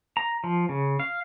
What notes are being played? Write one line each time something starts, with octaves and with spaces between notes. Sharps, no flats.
A#5
F3
C#3
F5